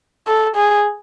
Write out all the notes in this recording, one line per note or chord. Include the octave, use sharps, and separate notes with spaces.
A4
G#4